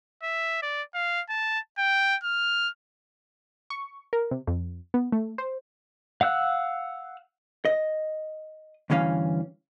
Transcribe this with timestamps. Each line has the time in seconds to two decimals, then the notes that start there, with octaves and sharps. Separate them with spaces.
0.23 E5
0.62 D5
0.94 F5
1.30 A5
1.78 G5
2.24 F6
3.70 C#6
4.13 A#4
4.31 C3
4.47 F2
4.94 B3
5.12 A3
5.38 C5
6.21 F5 F#5 E6 F#6
7.65 D#5
8.90 D2 G2 E3 C#4 F5